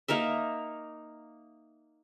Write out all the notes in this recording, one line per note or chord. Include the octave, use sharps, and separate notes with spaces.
A#3 D#4 A#4 E5